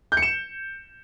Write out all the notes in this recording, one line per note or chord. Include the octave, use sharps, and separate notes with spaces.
G6
C#7
E7